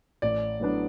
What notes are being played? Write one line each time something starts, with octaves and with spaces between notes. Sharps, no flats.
A1 D5
A2 F#3 B3 D4